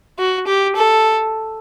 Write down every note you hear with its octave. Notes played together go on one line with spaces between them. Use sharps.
F#4
G4
A4